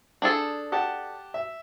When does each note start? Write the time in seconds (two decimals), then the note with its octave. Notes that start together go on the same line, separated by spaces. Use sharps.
0.22 D4 G#4 A4
0.72 G4 F#5 A5
1.34 E5